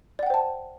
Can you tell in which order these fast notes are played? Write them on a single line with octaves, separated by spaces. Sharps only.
D5 F#5 G5 C5 A5